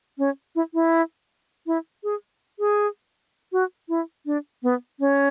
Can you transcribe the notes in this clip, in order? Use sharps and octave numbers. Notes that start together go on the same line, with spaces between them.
C#4
E4
E4
E4
G#4
G#4
F#4
E4
D4
B3
C#4